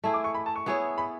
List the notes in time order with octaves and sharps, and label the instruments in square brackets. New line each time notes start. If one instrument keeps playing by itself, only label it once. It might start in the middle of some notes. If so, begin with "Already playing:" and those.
[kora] A3 E4 G#4
[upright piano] D6
C#6
B5
A5
C#6
[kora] B3 E4 G#4 C#5
[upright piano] B5